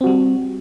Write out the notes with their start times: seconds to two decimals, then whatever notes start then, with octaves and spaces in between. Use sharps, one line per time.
0.01 C4
0.04 F#4
0.07 G3